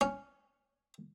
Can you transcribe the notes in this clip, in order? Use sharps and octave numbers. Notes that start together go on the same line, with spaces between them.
C#4